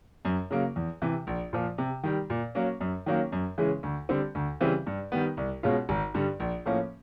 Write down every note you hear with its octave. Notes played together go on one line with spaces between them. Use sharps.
F#2
C#3 F#3 A#3
E2
C3 E3
A#1
A#2 F3
C3
D#3 G3
A#2
F#3 A#3 C#4
F#2
D#3 F#3 A#3 C#4
F#2
C#3 E3 G#3 C#4
D2
D3 G3 C4
D2
C#3 E3 G3 C4
G2
D#3 G3 B3
C2
B2 G#3 C#4 F4
G#1
G2 D3 G3
A#1
A2 F3 A#3 C#4